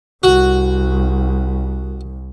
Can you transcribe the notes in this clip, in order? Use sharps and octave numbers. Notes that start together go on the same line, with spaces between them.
C2 F#4